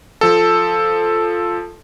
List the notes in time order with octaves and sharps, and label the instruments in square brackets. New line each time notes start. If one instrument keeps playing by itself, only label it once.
[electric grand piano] F3 A4